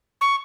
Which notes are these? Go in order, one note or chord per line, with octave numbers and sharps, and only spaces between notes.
C#6